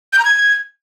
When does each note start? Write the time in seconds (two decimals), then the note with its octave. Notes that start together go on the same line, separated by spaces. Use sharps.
0.13 G6
0.19 A#5
0.25 G#6